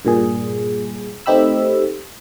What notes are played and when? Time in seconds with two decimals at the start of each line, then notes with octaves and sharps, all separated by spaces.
0.05 G2 A#2 G#4
1.26 A3 C4 D#4 G4 B5 E6